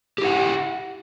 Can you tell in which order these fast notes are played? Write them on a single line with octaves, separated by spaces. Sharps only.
G4 E4 F#5